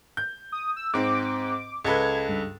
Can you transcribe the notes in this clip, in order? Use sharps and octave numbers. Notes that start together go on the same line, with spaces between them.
G6
D#6
E6
G#2 C4 D6
C#2 A4 B4 G#6
G2